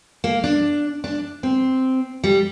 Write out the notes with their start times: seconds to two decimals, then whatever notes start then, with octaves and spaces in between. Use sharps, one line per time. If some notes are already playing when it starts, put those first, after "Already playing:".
0.24 A#3
0.44 D4
1.04 D4
1.43 C4
2.24 G3